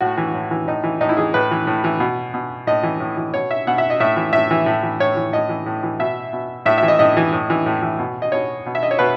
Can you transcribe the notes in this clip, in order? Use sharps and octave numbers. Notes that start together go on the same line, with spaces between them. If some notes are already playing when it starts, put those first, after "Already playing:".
A2 F#4
E3
A2
E3
A2 D#4
E3
A2 D#4
E4
E3 G#4
A2 B4
E3
A2
E3
B2
B2
A2 D#5
E3
A2
E3
B2 C#5
E5
B2 F#5
E5
D#5
A2 E5
E3
A2 E5
E3
A2
E3
A2 C#5
E3
A2 D#5
E3
A2
E3
B2 E5
B2
A2 E5
E5
E3
D#5
A2 D#5
E3
A2
E3
A2
E3
B2
D#5
B2 C#5
B2
E5
D#5
C#5
B2 B4